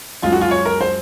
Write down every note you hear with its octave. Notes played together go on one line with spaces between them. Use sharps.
F#2 F3 G#3 F4
F#4
F4
C#5
A#4
C5